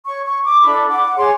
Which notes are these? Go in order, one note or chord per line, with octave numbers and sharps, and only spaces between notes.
C#5 C#6
C#6
D6
D4 E4 A4 B5
F#5 D6
G#4 C#5 C6 D6